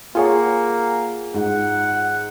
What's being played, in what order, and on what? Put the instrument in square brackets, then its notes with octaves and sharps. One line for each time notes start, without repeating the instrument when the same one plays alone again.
[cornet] A#3 [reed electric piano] F4 G#4 C#5 [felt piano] F#5 G#5
[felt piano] G#2 [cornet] F#5